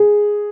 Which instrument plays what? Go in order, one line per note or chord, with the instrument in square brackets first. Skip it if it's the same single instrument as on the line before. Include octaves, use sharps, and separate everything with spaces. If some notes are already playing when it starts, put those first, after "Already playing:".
Already playing: [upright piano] G#4